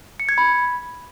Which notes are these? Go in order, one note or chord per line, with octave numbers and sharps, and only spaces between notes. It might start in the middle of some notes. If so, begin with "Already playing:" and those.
C#7
G#6
B5